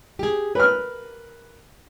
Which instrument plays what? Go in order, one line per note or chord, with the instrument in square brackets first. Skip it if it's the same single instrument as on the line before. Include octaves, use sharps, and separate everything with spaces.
[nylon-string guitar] G4 G#4
[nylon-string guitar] A#4 [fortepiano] B4 F6